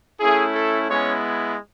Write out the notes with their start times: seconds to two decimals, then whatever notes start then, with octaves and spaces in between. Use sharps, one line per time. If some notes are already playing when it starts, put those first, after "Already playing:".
0.20 A3 C#4 E4 G#4
0.55 A4
0.90 G#3 B3 C#4 E4 C#5